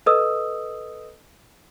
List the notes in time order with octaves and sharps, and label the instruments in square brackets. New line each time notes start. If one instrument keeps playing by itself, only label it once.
[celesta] A4 B4 D#5 D#6 E6